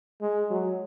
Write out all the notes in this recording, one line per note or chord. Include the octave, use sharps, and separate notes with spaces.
G#3
F#3